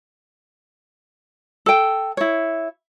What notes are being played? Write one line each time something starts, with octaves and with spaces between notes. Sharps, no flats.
A4 G5
E4 C#5